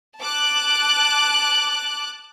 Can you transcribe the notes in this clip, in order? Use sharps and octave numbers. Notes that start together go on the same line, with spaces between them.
A5 D6 F#6